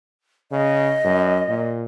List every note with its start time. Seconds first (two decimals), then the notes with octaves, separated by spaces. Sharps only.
0.52 C#3 D#5
1.04 F#2
1.48 A#2